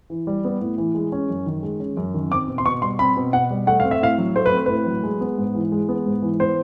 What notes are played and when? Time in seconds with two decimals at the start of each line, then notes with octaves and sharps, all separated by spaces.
0.10 E3
0.27 G3
0.45 B3
0.61 A2
0.78 E3
0.95 G#3
1.12 C#4
1.29 F#2
1.46 D#3
1.63 G#3
1.80 C#4
1.97 F#2
2.14 D#3
2.31 C4 D6
2.48 B2
2.58 C6
2.65 B2 C#6
2.82 G3 C6
2.99 C4 B5
3.17 B2
3.33 B2 F#5
3.51 G3
3.67 A3 F#5
3.80 C4 F5
3.91 E5
4.02 A2 F5
4.18 F#3
4.36 A3 C5
4.46 B4
4.52 C4
4.66 A2 B4
4.86 F#3
5.03 G#3
5.21 B3
5.38 G#2
5.55 E3
5.72 G#3
5.89 B3
6.06 G#2
6.22 E3
6.40 B3 C5